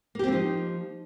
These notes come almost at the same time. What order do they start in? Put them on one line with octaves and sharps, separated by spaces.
A#3 G4 C4 F3 D#4